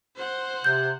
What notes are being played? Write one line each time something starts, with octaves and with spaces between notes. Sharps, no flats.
C5 F#5
C3 G6